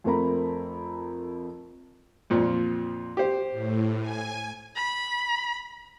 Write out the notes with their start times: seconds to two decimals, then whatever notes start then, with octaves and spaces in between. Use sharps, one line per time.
0.04 F2 A3 C4 A#4 A#5 B5
2.30 F2 A#2 F3
3.17 G4 C5
3.52 A2
4.01 G#5
4.76 B5